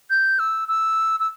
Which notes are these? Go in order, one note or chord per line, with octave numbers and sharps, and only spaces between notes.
G6
E6
E6
E6